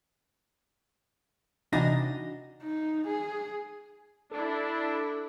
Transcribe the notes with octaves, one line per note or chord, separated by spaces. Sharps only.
C3 E3 D4 D#4 F#4 A#6
D#4
G#4
D4 E4 A4